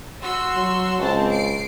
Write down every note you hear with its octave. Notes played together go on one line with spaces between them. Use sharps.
F#4 C6 E6
F#3
C#2 C4 C5 A5
C7 D7